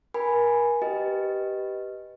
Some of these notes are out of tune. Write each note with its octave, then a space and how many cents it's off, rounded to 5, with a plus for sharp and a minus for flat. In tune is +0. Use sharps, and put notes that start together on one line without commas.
A#4 +35 G#5 +0 B5 +0
G4 -15 B4 +0 D#5 +0